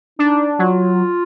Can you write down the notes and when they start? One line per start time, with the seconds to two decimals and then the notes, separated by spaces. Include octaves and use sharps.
0.19 D4 D#4
0.59 F#3 F4